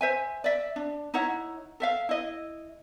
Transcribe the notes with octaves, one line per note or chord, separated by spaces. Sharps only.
C5 E5 G#5
D5 E5
D4
D#4 E4 C#5 F#5
A4 E5 F5
E4 D#5